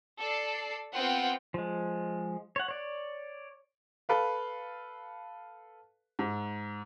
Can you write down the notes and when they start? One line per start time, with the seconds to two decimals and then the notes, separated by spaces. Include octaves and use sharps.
0.20 A4 D5 C7
0.94 B3 C4 F4 F#5 G5
1.54 F3 G#3
2.56 C#5 F#5
2.68 C#5 D5
4.09 A4 B4 F5
6.19 G#2